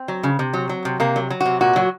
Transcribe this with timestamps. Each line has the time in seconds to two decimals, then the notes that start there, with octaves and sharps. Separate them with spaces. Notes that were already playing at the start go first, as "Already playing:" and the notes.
Already playing: C4
0.08 F#3
0.23 C#3
0.39 C3
0.53 F#3
0.69 F#3
0.85 C3
1.00 C3 A#3
1.16 F#3
1.30 F#3
1.41 F#4
1.46 C3
1.61 A#2 F#4
1.76 F#3